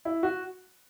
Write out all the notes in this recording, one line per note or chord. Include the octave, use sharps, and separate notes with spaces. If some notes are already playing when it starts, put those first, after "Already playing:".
E4
F#4